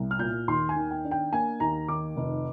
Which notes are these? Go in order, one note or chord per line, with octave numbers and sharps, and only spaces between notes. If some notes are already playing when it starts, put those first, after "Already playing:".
Already playing: C2
F6
A#2 G6
D#2 C6
G#5
D#3
G5
D4
G5
A#3 G#5
D#2 A#5
D#3 D6
F1